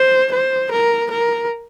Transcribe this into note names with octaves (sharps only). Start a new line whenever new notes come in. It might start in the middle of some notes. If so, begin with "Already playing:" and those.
Already playing: C5
C5
A#4
A#4